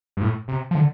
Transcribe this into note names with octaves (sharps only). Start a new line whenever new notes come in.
G2
A2
C3
F3
D3